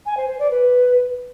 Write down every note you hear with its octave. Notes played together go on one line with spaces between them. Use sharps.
G#5
C5
C5
D5
B4